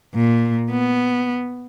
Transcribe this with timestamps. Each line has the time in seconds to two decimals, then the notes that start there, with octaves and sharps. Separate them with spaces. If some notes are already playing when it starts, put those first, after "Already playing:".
0.15 A#2
0.70 B3